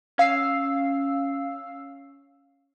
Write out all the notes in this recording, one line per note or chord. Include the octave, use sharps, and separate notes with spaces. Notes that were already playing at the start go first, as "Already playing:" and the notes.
C#4 F5 E6 C7